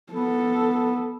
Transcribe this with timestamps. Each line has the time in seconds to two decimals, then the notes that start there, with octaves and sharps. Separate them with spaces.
0.13 B3 A4